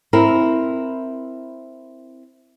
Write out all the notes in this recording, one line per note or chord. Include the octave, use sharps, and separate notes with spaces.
C4 E4 A#4